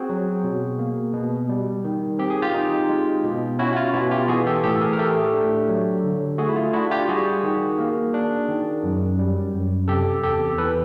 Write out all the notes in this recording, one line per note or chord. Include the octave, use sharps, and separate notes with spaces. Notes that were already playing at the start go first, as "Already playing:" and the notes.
Already playing: C4 F#4 G#4
F#3
B2
A#3
B2
G3
D#3
C4 G4
G#4
F4 G4
D#4
G#3
B2
C#4 E4 F#4
F#4
F4
B2 E4 F#4
F4 G4
E3 F#4 G#4
G4 A4
A2 G4 A4
A4
G#4 A#4
A#4
A3 G4 A4
D4
F#3
D3
A3 F#4 G#4
E4
F4
D4 E4 F#4
F4 G4
G3 F#4 G#4
D#3
A#3
D4
D#3
F#2
G3
F#2
C3 G4 A4
E2 G4 A4
E3 A4 B4